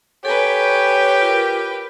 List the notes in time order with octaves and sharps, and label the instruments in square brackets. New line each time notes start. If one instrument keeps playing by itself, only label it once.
[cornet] G4 [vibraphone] A4 G#5 A#5 [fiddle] B4 G5 [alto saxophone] C#5
[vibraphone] F4 A#4